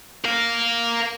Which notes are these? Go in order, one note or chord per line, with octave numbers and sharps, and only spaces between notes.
A#4 F5